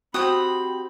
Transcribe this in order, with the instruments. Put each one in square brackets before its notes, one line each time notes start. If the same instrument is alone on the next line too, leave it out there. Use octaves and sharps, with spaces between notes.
[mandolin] C4 G4 D#6 [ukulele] F#4 [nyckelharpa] B5